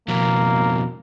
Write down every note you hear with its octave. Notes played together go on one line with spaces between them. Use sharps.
F2 B2 A#3